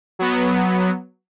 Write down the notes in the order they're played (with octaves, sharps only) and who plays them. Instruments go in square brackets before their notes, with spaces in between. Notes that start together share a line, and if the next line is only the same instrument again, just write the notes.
[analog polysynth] F#3 B3